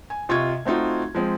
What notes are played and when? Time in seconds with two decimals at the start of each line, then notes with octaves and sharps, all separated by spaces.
0.10 G#5
0.29 C3 F4 D#5 C#6 G#6
0.65 A3 C4 D#4 F4 F#4
1.15 F3 G#3 C4